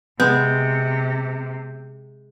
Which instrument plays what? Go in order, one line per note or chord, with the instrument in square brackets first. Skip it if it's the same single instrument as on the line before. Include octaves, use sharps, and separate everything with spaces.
[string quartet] C3 [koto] G#3 [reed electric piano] B3 [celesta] G6